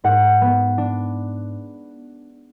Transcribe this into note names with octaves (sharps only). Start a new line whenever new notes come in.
G#2 F#5
B3
D4